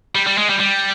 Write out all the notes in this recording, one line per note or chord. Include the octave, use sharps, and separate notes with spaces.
G3
G3
G#3
G3
G3